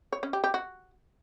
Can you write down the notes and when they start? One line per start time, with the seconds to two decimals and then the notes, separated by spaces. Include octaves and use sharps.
0.12 C#5
0.23 C#4
0.33 G4
0.44 G4
0.54 F#4